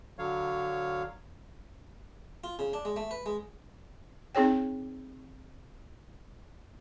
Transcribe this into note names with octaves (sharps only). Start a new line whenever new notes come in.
D3 F#3 C#5 F5
F4
C#3
D4
G#3
A3
B4
G#3
C4 D#4 G#4 C#5 G5